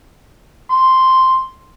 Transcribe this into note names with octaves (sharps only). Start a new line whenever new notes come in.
C6